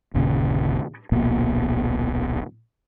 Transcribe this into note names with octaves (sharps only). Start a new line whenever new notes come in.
G1 D#2 A#2 C#3
D1 A#1 B2 A#3